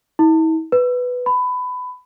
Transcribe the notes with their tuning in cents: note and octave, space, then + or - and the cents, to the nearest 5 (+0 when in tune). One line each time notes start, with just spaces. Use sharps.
E4 -45
B4 +5
B5 +20